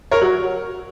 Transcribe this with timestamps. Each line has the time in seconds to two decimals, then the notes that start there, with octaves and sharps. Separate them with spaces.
0.11 A#4 C#5
0.21 F#3